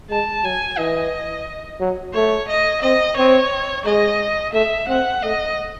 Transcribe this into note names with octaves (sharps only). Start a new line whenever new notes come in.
G#3 A5
F#3 G#5
E3 D#5
F#3
A3 C#5
D#5
C4 D#5
C4 C#5
G#3 D#5
A3 E5
C4 F#5
A3 D#5